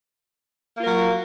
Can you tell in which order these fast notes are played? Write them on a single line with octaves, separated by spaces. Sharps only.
A#3 F4 A#4 F#3